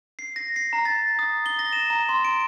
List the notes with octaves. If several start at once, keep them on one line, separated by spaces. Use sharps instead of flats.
C7
A#6
C7
A#5
A6
D#6
G7
A#6
E7
A#5
C6
D7